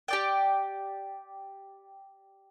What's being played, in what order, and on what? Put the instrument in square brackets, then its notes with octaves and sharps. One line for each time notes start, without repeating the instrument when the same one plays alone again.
[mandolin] G4 D5 G5